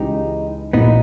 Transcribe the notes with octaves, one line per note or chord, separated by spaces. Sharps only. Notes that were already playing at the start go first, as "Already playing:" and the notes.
Already playing: C#2 C#3 E3 G#3 D#4 G4
A#1 A#2 A#3 B3 D#4 E4 G4